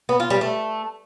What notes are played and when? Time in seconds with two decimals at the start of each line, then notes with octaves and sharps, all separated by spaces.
0.09 B3
0.20 F4
0.30 G3
0.41 A3